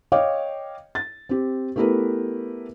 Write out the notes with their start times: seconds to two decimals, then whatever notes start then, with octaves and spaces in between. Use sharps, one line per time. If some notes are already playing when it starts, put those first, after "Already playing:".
0.12 C#5 D#5 F5 G5 D6
0.95 A6
1.29 C4 G4
1.76 A3 B3 E4 G4 A#4 B4